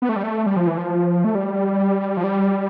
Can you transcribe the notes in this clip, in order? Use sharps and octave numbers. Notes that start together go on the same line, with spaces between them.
B3
A3
G3
A3
G3
F3
E3
F3
A3
G3
F3
G3